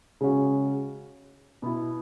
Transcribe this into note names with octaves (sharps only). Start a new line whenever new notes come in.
C#3 G#3 C#4 F#4
B2 B3 E4